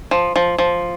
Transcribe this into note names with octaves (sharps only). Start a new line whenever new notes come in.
F3
F3
F3